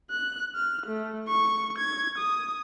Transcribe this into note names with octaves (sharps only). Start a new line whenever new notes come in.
F#6
F6
A3
C#6
G#6
D#6